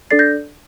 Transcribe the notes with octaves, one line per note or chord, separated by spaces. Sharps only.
D4 A4 D5 A6 C7
G6 A#6